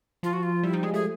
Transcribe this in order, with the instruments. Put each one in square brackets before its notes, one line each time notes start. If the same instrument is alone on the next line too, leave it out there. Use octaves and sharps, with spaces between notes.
[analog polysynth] F3 [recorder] F4
[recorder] F#4
F4
[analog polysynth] G3 [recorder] E4
[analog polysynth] G3 [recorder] D#4
[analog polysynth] G#3 [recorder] G#4
[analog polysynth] A3 [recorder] G#4